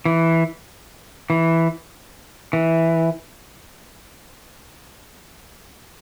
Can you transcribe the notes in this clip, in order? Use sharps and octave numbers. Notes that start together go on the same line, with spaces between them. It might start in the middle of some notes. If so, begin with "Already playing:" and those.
E3
E3
E3